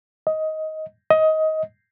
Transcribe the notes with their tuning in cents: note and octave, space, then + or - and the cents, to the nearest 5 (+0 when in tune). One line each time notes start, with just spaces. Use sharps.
D#5 +15
D#5 +20